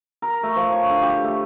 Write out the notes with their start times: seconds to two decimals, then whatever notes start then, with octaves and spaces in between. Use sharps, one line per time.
0.22 A#4
0.43 A3
0.56 F3
0.72 C#5
0.90 D3
1.02 G4
1.24 A3